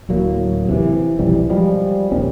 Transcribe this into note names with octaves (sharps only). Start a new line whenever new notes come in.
D1 A2 F#3 A#3
C3 E3
B1 F2 E3 G3
F3 G3 G#3
D#1 D#2 C4 C#4